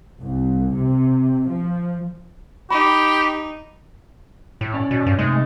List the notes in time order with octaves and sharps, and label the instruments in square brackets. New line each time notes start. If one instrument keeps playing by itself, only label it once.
[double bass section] C2
C3
F3
[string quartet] D#4 [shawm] G4 [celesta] B5
[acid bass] A2
[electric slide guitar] C#4 C#5 D5
[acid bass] B2
G2
[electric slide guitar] C3 A3 D#4 [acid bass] G#3